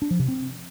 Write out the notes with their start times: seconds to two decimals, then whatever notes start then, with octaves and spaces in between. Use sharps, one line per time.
0.02 D4
0.11 F3
0.19 C3
0.28 C4